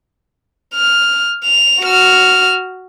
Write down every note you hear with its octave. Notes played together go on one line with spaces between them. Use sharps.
F6
F7
F#4 F6